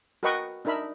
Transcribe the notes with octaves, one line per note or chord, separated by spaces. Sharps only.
F#4 A#4 B4 D#5 G5 C#6
D4 D#4 A#4 E5 B5